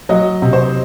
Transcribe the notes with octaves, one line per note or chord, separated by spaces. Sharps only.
F#3 D#5
C3
C5